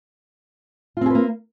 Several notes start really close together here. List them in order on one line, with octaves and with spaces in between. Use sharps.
F4 C4 G#4 B4 A#3